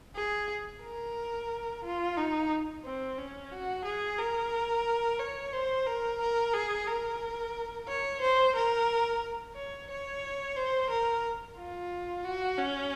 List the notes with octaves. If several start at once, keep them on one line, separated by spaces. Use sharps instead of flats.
G#4
A#4
F4
D#4
C4
C#4
F#4
G#4
A#4
C#5
C5
A#4
A#4
G#4
A#4
C#5
C5
A#4
C#5
C#5
C5
A#4
F4
F#4
C#4